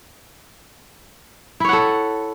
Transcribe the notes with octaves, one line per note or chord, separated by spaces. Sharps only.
E4 A4 C#5 F#5